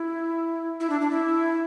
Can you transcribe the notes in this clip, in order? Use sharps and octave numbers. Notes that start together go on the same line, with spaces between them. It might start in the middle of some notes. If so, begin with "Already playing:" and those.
Already playing: E4
E4
D4
D4
E4